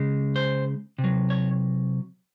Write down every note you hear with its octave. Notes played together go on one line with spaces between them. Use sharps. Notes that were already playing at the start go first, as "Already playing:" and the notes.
Already playing: C#3 G#3
C5
C3
F#3
C#5